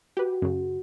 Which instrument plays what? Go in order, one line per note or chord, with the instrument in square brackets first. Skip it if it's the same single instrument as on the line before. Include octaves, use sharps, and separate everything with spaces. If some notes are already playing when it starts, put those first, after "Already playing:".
[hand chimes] F#4 [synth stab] G4 B4
[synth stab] F#2 C#3